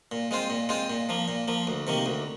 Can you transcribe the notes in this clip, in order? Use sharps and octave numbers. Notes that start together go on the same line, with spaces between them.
A#2
G#3 C4 F4 C5
A#2
G#3 C4 F4 C5
A#2
F3 A#3
A#2
F3 A#3
D2
C3 D#3 A#3
D2